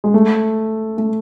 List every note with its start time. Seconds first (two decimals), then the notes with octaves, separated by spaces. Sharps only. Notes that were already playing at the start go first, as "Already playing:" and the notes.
0.04 G#3
0.14 A3
0.98 A3